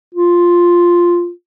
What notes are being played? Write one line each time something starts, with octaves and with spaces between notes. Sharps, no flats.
F4